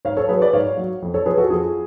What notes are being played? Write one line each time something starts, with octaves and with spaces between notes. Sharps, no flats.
G#2 C#5 F5
A4 C#5
F#3 G#4 B4
B4 D5
G#2 C#5 F5
F#3
F2
A4 C#5
F3 G#4 B4
F#4 A4
F2 F4 G#4